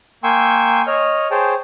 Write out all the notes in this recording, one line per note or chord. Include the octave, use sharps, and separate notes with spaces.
A#3 G5 G#5 C6 C#6 E6
C#5 D#5 F6
G#4 C5 C#5 G5 A5